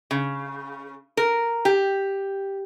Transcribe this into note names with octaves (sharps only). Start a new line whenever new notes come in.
C#3
A#4
G4